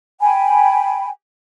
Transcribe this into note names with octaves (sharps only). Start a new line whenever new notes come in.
G5 G#5 B5